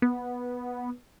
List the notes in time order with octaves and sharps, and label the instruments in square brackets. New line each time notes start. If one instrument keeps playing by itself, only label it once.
[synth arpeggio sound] B3